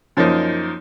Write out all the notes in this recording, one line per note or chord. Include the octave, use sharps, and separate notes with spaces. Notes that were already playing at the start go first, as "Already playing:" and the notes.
F#2 F3 A#3 D#4